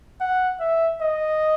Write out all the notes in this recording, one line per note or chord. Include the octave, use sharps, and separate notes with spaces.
F#5
E5
D#5